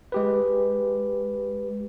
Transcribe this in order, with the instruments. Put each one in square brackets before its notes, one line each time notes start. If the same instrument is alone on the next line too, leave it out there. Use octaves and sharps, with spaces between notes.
[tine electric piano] G#3 G4 B4